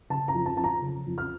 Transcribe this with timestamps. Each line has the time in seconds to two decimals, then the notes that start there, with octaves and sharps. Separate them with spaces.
0.10 C#3 A5
0.28 A#5
0.34 F2
0.46 A5
0.57 F2 A5
0.64 A#5
0.82 C#3
1.06 F2
1.18 F6